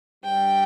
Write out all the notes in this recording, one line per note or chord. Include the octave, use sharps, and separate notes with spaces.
G2 D3 G3 G5